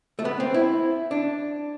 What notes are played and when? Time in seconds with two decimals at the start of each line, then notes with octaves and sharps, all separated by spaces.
0.19 A3
0.25 B3
0.40 C4
0.54 E4
1.11 D4